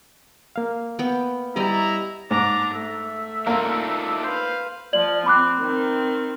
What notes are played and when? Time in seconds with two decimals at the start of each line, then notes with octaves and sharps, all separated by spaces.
0.56 A#3 F5
0.99 B3 G5
1.56 G3 E4 G4 D5 D#5 A#5
2.31 G#2 D4 A#5 D6
2.74 A3 E5
3.47 A#3 D4 D#4 F4
4.24 B4 C5 F5
4.93 F3 F4 D5 F#7
5.26 C4 B5 D6 F#6
5.59 D#3 C4